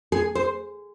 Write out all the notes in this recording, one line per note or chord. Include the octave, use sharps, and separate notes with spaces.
G#4
C5